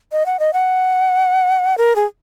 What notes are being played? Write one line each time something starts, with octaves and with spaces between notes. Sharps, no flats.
D#5
F#5
D#5
F#5
A#4
G#4